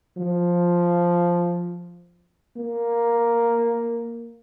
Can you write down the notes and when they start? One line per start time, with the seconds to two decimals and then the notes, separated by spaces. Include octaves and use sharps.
0.17 F3
2.57 A#3